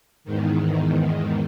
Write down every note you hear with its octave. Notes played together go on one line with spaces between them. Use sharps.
E2 G#2 D#3